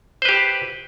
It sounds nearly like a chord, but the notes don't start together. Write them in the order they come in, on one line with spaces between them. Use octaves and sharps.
C5 B4 G4